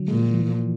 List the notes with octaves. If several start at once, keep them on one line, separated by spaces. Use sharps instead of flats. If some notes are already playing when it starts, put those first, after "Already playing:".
Already playing: D3 F#3
A#2 G#3
F3
E3
E3
F3
E3